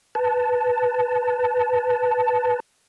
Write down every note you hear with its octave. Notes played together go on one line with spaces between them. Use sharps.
B4 A5